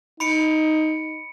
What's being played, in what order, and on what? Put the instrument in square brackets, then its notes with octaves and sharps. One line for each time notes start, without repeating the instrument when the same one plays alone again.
[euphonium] D#4 [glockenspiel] B5 C#7 D7